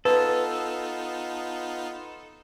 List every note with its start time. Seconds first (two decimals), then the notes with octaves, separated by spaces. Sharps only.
0.05 B3 D#4 F4 A4 B4